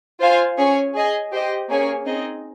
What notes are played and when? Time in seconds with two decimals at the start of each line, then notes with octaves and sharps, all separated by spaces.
0.20 F4 C5 F5 G#5
0.57 C#4 G#4 C#5 G#5
0.94 G#4 D#5 G#5
1.32 G4 C5 D#5
1.69 A#3 C#4 G#4 C#5 G#5
2.06 C4 D#4 G#4 D#5